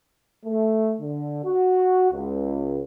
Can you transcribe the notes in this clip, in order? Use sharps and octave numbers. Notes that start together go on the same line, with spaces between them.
A3
D3
F#4
C#2